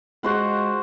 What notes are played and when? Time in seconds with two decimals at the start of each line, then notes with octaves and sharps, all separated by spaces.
0.23 G#3 F#4 C5 F#5